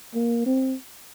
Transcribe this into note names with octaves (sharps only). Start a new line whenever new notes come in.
A#3
C4